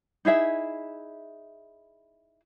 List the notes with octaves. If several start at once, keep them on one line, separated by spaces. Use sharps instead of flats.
D#4 E4 G#4 E5